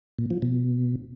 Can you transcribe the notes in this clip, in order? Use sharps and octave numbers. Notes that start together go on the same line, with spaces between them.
A#2
F3
B2